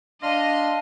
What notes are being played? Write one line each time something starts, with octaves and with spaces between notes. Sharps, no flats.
D4 D#5 F5 A5 C6 F6